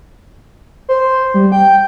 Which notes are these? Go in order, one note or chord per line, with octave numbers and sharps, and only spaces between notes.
C5
G3
G5